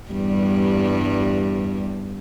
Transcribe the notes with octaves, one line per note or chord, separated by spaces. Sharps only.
E2 G2 G3